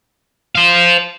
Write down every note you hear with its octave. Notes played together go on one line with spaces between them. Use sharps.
C5 F5